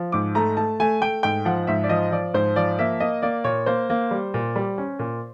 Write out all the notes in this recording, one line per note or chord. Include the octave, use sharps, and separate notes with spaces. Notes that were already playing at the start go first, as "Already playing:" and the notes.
Already playing: F3
G#2 D6
A3 A#5
A3 A5
A3 G#5
A3 G5
G#2 G5
F3 F#5
G#2 E5
D5
F3 D#5
F3 D5
G#2 C5
F3 D5
A#3 E5
A#3 D#5
A#3 D5
A#2 C#5
A#3 C5
A#3
G3
A#2
G3
C#4
A#2